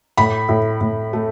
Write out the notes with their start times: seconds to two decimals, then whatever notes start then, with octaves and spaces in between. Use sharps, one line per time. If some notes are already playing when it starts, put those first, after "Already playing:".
0.17 A2 B5
0.49 A2
0.81 A2
1.13 A3